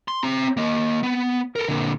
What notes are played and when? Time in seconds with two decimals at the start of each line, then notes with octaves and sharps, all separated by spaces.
0.08 C6
0.23 C4 A#5
0.57 A#3 D#5
1.03 B3
1.56 A4 A#4
1.69 A#2 D3